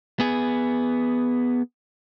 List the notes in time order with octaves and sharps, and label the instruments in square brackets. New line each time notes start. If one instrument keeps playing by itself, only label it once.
[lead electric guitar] B3 G#4